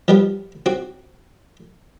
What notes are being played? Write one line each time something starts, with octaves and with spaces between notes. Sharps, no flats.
F3 G3 B3
C4 F#4